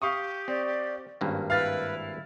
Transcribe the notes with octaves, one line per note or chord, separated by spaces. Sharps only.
G4 F5 C#6 D#6
C4 D5
G#1 G2 A#3 C#4
E4 B4 F5 F6 A6